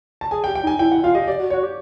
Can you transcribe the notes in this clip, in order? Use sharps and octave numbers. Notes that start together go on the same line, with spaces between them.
A5
G#4 G#5
G5
G4
G5
D#4 G#5
E4 G5
E4 F#5
F4 F5
G4 D#5
G4 D5
F#4
F#4 C#5
G4